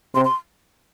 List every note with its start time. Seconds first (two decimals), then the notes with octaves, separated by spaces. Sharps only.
0.15 C3 C6
0.25 C6